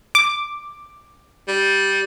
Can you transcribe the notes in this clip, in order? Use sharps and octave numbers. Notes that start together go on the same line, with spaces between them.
D6
G3